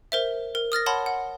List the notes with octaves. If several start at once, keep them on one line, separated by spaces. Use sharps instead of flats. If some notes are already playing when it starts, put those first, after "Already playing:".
A#4 C5 E5
A#4
D#6 F6 A6 A#6
C#5 F#5 A5 B5 C6
F#5